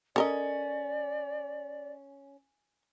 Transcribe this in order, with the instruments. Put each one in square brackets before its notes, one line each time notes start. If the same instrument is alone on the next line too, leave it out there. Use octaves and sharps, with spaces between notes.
[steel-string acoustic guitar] C#4 [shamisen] A4 A#4 D#5 [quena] D5